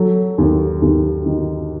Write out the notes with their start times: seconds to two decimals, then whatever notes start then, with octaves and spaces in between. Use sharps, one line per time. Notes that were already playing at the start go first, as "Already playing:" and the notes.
Already playing: F#3 A4
0.38 D#2
0.82 D#2
1.26 D#3